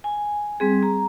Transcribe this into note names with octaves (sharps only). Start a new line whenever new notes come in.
G#5
G3 C4 G#4
A#5